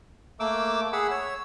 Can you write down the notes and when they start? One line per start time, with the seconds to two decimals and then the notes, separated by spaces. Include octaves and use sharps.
0.40 A3 A#3 D6 E6
0.93 G#4 F#5 B5 E6
1.11 C#5 E6